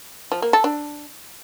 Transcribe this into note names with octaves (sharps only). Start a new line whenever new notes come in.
F3
A#3
A4
D4